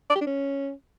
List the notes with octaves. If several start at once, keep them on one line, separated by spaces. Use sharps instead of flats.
D5
G4
D4
C#4